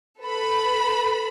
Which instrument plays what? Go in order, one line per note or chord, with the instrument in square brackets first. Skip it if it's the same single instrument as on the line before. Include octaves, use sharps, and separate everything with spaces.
[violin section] A4 B4 B5